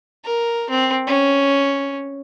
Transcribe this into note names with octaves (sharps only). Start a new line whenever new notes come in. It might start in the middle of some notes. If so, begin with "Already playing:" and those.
A#4
C4
C#4